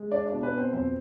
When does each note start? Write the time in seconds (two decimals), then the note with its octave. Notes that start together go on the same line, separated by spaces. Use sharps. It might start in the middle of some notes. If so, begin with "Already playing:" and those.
Already playing: G#3
0.11 D4 D5
0.26 D4 D5
0.33 B2
0.43 B4
0.52 B3
0.58 C4 C5
0.73 F2 C4 C5